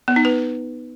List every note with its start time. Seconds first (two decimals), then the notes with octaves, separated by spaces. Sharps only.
0.08 B3
0.16 D#4
0.25 B4